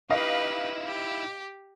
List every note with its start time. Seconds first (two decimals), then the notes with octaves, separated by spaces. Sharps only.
0.10 D#4 E4 G4 B4 D#5 F5
0.87 G4